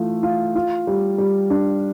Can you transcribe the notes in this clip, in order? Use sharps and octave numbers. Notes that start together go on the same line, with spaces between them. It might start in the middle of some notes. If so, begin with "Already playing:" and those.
Already playing: E3 A3 F4
F4
F4
G3
G3
D4